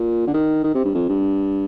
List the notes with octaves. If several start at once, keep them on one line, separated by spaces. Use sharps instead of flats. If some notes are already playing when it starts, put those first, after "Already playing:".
Already playing: A#2
D3
D#3
D#3
C3
G2
F2
G2